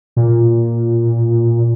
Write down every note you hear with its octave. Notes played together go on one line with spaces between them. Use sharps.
A#2